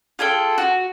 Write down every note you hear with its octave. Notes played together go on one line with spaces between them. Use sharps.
F4 G#4 A4 G5
F#4